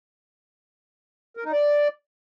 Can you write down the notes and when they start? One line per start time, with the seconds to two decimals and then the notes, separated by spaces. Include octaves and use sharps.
1.37 A#4
1.45 D#4
1.52 D5